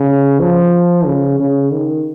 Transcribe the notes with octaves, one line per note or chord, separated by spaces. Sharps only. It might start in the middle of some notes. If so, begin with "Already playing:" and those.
Already playing: C#3
F3
C#3
C#3
D#3